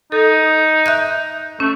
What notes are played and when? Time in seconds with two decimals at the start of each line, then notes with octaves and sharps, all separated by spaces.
0.12 D#4 A4
0.86 E5 F#6 G6
1.60 A3 C#4